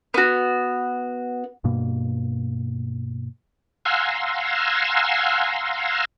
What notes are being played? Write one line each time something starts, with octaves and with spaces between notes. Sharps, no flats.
B3 F#4
G2 B2 A#3
F5 F#5 G#5 A#5 C6 E6